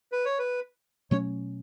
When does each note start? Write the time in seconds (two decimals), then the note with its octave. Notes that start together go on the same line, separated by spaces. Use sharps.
0.12 B4
0.25 C#5
0.39 B4
1.11 B2 F#3 A3 C#4 C#5